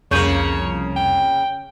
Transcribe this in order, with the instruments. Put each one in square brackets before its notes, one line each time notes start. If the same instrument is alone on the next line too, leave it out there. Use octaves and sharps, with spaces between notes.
[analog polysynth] C2 F2 [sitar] C#3 A#3 [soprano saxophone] C#5 [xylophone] C#6 G6 D#7
[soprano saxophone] G5